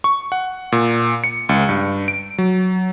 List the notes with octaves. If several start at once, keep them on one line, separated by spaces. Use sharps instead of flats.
C#6
F#5
A#2
C#7
C#2
G2
D7
F#3